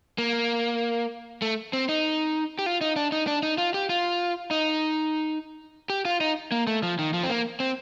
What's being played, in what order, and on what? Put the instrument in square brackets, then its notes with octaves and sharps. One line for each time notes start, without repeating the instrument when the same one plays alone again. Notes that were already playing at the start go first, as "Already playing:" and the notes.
[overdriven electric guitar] A#3
A3
C4
D#4
G4
F4
D#4
D4
D#4
D4
D#4
F4
G4
F4
D#4
G4
F4
D#4
A#3
A3
F3
D#3
F3
C4
A#3
C4